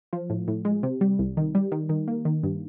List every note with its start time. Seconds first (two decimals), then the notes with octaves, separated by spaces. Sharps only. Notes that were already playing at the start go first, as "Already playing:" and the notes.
0.13 F3
0.30 A2
0.48 A2
0.65 G#3
0.83 C3
1.01 G3
1.19 C2
1.37 D#3
1.55 G3
1.72 D#3
1.89 D#3
2.08 A#3
2.25 D#3
2.43 G2